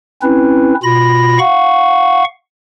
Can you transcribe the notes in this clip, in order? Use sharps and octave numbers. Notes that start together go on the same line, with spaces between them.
C4 C#4 E4 B4
B2 F4 B5 A#6
F5 F#5 C#6